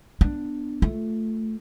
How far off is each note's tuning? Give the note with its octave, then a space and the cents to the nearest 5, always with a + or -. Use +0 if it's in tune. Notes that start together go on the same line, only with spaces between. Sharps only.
B3 +0 D4 +5
A3 +0 F4 -10